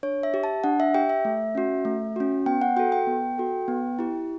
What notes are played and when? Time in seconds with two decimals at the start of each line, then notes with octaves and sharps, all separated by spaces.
0.03 D4 C#5
0.23 E5
0.34 G4
0.44 A5
0.64 D4 F#5
0.80 E5
0.95 G4 G5
1.09 E5
1.25 A3
1.55 C#4 F#4
1.85 A3
2.16 C#4 F#4
2.46 B3 G5
2.62 F#5
2.76 F#4 A4 G5
2.92 G5
3.07 B3
3.38 F#4 A4
3.68 B3
3.99 E4 G4